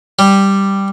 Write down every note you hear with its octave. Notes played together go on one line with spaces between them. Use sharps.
G3